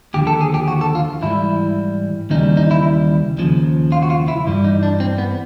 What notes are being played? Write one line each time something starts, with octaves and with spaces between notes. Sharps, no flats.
D#2 D3 F3 G4
A4
G#4
G4
F#4
A4
F4
G#2 E3 G3 E4
D#2 C#3 E3 G3 D#4
D#4
E4
D#2 C#3 F3
F4
F#4
F4
E4
G2 E3 G3
D#4
D4
C4
B3